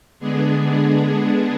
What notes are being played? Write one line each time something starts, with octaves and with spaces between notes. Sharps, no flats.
D3 G#3 B3 D4 G#4